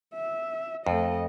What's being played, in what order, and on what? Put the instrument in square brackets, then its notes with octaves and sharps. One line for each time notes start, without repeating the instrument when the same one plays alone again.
[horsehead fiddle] E5
[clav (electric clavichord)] F2 [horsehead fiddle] A3 D#5